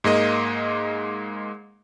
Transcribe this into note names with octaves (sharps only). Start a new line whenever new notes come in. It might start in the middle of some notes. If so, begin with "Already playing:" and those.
G#2 G#3 A#3 D#5